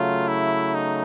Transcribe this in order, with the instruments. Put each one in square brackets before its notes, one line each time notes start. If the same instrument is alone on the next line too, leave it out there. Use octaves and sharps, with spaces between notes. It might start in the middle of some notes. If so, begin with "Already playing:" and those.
Already playing: [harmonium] C#3 F#3 A3 [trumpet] F4
[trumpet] E4
D#4